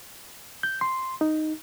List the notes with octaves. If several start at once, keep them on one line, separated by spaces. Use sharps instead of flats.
G6
C6
D#4